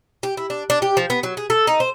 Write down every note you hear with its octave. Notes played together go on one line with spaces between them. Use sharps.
G4
E4
D4
D4
G4
F3
B3
F#3
G#4
A4
D#4
C5